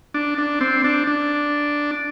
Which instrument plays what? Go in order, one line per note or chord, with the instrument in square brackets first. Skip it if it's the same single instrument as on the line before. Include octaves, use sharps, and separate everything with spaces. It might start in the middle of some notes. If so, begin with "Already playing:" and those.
[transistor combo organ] D4
D4
C4
D4
D4